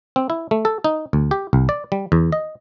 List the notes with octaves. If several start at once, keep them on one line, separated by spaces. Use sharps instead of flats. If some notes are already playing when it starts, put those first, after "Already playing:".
C4
E4
A3
A4
D#4
D2
G4
C2
D5
G3
E2
D#5